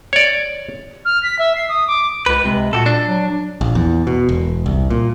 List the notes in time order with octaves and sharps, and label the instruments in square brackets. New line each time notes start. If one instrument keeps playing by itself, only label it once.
[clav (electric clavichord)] C#5 D5
[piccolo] F6
B6
E5
C7
D#6
D6
[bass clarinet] C#2 [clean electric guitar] B4
[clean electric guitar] C3 [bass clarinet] G#3
[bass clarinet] A#2 [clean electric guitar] F#4 G4 A4
[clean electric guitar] D4
[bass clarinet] F#3
D4
[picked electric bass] A#1
E2
B2
E1
C2
A#2